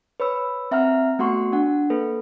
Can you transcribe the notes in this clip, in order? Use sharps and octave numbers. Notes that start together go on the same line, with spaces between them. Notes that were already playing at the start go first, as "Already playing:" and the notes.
B4 C#5 B5 E6
C4 E5 F#5 A#5 F6
A3 B3 F#4 F#5 C6 C#6
D4 F#5
A#3 A4 B4